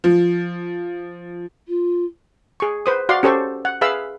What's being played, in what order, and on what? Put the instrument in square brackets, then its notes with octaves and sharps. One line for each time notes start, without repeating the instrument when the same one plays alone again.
[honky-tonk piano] F3
[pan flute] F4
[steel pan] G#4 C#6
B4 C5 D#6
F#4 D5 F5 C6
C#4 G4 A4 C5 C#6
F#5
G#4 B4 E5 F5 B5 E6